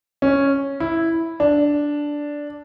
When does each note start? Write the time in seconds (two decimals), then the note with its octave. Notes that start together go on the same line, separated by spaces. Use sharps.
0.22 C#4
0.80 E4
1.40 D4